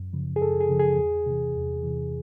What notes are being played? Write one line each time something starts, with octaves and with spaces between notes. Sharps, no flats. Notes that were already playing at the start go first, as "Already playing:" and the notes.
Already playing: F#2
C#3 F3
G#4
F#2 A4
G#4
C#3 F3
G#4
E2
C3 E3
E2
C3 E3